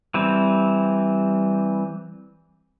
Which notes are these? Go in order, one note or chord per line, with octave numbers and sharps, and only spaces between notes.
E3 G3 C4